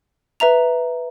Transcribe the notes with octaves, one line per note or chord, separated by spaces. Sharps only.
B4 E5 A#5 F7